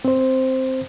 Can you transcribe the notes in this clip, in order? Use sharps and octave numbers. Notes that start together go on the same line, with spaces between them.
C4 C5